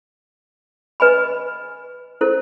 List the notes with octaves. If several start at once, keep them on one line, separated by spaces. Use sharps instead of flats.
B4 D#5 G#5 B5
E4 A4 C5